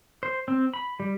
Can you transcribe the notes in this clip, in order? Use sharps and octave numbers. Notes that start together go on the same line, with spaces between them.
C5
C4
B5
G3